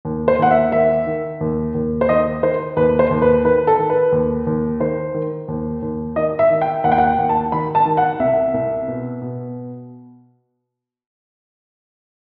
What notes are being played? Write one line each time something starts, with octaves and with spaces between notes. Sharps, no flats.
D#2
C5
D#2 F#5
E5
D#3 E5
D#3
D#2
D#2
C5
D#3 D#5
D#3 C5
D#2 B4
C5
D#2
B4
D#3 B4
A4
D#3
B4
D#2
D#2
D#3 C5
D#3
D#2
D#2
D#3 D#5
E5
D#3
G5
D#2 F#5
G5
F#5
G5
D#2
A5
D#3 B5
A5
D#3
F#5
C2 E5
C2
B2
B2